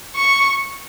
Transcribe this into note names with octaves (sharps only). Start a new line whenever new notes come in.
C#6